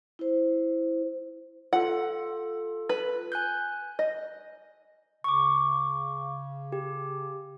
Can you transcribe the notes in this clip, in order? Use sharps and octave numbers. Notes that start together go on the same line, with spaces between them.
E4 C5
F4 A4 F#5
B4
G#5 F#6 G6
D#5
C#3 C#6 D6
G4